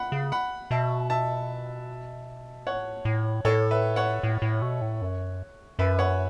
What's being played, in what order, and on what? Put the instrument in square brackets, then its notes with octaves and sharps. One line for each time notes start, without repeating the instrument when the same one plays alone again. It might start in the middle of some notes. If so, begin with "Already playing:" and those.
Already playing: [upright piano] F#5 B5
[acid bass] C#3
[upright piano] F#5 B5
[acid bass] B2 [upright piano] E5 A5
[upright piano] E5 A5
[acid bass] A2 [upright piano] C#5 F#5
[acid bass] A2
[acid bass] A2 [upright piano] A4 C#5
[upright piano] B4 E5
C#5 F#5
[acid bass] A2
A2
B2
A2
F#2
[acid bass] F#2 [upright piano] B4 E5
[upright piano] C#5 F#5